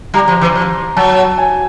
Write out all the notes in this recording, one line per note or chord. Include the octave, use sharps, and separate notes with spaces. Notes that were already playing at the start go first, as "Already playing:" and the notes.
G3 A#5
F3
E3
F3
F#3 A5
G#5